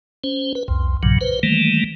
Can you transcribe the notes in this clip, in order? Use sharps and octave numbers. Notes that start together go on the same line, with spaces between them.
C#4 C5
B4
C2 F2
B1 G2 A#2 C#3 F#3
B4 C5
D#3 E3 G3 A3 A#3